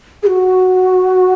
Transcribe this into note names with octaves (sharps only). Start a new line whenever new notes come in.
G#4
F#4